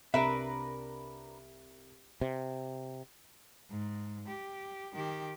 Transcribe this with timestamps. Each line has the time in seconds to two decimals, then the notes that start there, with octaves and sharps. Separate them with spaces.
0.14 C2 D4 A#4 B4 E5
2.21 C3
3.71 G#2
4.28 G4
4.94 D#3 G4